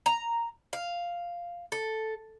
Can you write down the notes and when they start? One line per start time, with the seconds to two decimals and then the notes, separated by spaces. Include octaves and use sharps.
0.06 A#5
0.73 F5
1.72 A4